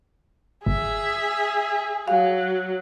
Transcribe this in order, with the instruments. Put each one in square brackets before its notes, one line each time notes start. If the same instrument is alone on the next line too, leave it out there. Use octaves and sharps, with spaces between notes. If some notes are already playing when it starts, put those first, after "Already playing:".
[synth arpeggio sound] G1 [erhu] G#4 [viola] E5
[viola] F#3 [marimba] F5